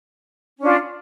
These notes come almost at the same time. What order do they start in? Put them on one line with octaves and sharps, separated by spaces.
C#4 D4 F4